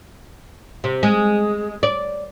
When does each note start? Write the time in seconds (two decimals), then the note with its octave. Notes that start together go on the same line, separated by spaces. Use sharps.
0.84 C3
1.03 G#3
1.83 D5